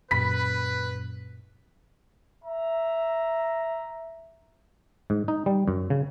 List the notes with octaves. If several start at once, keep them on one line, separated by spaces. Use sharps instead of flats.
F#2 A#2 B4 B5 B6
E5 A#5
G#2
D#4
G3
F#2
C#3